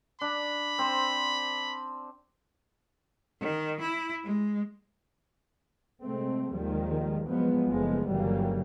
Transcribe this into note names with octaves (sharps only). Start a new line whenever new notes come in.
D4 B5
C4 C5
D#3
E4
G#3
C3 G#3 A3 C4
D#2 D#3 F3 G3 G#3
F3 F#3 G#3 B3
F#1 F3 G#3 A3 B3
G1 C#3 E3 F#3 G3 A#3